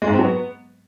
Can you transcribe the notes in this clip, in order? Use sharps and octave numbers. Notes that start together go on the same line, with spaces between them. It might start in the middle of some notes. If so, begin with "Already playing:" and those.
G#3
G#2
C4
F#3
B3